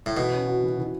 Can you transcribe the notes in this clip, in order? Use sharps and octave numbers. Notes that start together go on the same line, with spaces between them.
A2
B2 E3
C#4
F#4
E3
E3